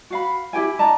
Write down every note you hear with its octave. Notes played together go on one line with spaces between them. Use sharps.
F#4 F5 B5
E4 G4 G5 G#5
D4 D#5 A5 A#5